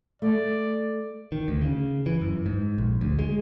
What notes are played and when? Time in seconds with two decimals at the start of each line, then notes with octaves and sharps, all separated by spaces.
0.22 A3 D5
1.32 D#3
1.48 D2
1.61 C#3
2.06 E3
2.21 F#2
2.46 G#2
2.78 A#1
3.01 D2
3.19 G#3